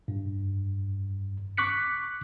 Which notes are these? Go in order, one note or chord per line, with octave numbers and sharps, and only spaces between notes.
G2
C#6 D6 F#6 B6 C#7